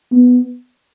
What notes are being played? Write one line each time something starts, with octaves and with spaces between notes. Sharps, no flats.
B3